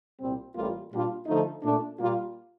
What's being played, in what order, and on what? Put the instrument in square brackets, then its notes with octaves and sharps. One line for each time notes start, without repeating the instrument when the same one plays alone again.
[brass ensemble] C2 A#2 G3 C4
A1 A2 G3 A#3 F4
A#2 G3 D4 F4
D3 F3 A3 D#4
A#2 A3 D4
A#2 G3 A#3 F4